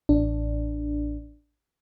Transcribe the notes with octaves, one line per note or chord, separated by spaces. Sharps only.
A1 D4